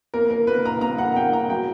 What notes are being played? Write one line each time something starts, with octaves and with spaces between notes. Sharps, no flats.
A#3 A#4
A#4
A#3 B4
A#5
A#3 A#5
F#5
A#3 G5
A#5
F#3 G5